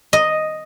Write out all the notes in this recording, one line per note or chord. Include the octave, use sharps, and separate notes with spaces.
D#5